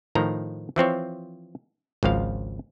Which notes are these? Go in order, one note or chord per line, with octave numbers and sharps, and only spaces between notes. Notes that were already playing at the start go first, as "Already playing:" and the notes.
A2 D#3 F3 A#5
E3 F3 C4 C#5
G#1 C#2 F3 F5